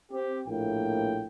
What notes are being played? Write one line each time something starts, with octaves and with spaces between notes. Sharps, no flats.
C4 G4
A#1 A2 A#3 G5